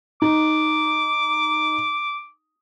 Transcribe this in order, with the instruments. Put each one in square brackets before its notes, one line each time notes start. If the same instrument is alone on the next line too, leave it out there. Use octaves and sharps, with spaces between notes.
[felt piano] D#4 [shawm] D6